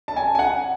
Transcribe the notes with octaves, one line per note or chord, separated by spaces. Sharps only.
A5
G#5
G#5
F#5